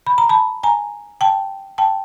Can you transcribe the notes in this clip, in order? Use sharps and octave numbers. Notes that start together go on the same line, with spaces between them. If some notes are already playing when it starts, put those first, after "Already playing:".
B5
A#5
A5 B5
G#5 A#5
G5 A5
G5 A5